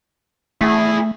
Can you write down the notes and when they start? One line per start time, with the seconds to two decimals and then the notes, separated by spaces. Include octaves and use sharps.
0.61 A3 E4 G#4